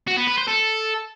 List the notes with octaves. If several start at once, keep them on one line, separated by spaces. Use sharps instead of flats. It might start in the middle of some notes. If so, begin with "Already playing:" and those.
F#4
B3
B4
C5
A4